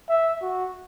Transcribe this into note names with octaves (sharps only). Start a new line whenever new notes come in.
E5
F#4